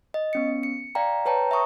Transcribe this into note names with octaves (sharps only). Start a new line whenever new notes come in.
D#5
B3 C#4 C#7
C#7
D5 F5 G5 A#5
B4 C#5 G5 A5 A#5
E5 A#5 C#6 D#6